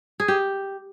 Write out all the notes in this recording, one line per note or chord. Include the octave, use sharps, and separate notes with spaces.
G#4
G4